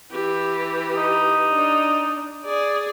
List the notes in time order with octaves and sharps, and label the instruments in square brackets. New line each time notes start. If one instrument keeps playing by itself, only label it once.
[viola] E3 G4
[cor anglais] D#4
[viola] D4
G#4 D5